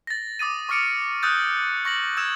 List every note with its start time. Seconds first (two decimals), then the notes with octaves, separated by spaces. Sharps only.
0.07 A6 A#6
0.39 D6 D#6 A6 D#7
0.69 C#6 D6 F6 C#7 D7
1.23 D#6 E6 F#6 G6 A6
1.85 C#6 A#6 F#7
2.17 E6 G#6 E7